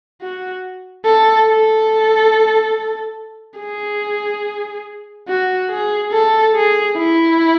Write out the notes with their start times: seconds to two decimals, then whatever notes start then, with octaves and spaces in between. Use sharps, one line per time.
0.22 F#4
1.05 A4
1.47 A4
3.60 G#4
5.28 F#4
5.70 G#4
6.13 A4
6.55 G#4
6.97 E4